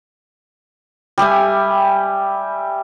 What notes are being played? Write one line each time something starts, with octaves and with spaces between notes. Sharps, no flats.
G3 G4 E5 G#5